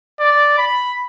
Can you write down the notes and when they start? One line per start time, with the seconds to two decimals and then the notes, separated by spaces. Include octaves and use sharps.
0.19 D5
0.58 B5